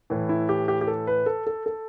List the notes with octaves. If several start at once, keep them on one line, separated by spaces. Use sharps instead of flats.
A2 E3
E4
G4
G4
G4
A4
B4
A4
A4
A4